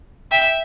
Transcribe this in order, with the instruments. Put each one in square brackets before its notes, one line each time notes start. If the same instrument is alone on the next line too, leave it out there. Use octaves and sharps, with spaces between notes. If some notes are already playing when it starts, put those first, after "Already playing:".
[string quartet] E5 G5